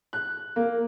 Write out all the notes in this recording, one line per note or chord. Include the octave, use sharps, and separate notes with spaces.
F#6
A#3